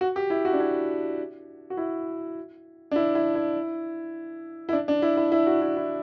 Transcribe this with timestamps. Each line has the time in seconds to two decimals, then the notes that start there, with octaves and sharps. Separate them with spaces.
0.01 F#4
0.16 G4
0.30 E4
0.45 F#4
0.53 D4
0.60 E4
1.70 F#4
1.77 E4
2.91 D4
2.96 E4
3.15 E4
3.35 E4
4.69 E4
4.73 D4
4.88 D4
5.02 E4
5.17 E4
5.32 E4
5.47 F#4
5.62 E4
5.77 E4